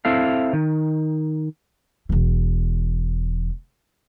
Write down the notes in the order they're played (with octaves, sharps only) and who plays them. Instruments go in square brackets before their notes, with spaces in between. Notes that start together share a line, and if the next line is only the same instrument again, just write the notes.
[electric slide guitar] C4 E4 A4 F5
D#3
[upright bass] E1 E3